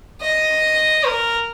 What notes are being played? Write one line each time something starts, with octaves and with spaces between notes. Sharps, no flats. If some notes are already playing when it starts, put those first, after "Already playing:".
D#5
A#4